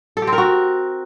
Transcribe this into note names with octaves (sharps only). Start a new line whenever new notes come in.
A4
G4
C4
A#4
F#4